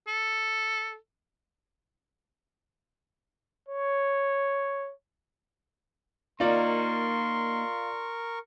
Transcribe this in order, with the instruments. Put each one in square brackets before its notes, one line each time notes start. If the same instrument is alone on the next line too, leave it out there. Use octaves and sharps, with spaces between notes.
[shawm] A4
[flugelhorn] C#5
[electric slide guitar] A#3 D#4 [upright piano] F4 D5 [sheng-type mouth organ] A#4 C#6 [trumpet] C6